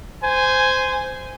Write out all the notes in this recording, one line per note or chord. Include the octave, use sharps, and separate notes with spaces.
C5 G#5